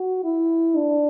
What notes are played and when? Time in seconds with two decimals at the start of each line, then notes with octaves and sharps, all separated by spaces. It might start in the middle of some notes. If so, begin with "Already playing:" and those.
Already playing: F#4
0.24 E4
0.76 D4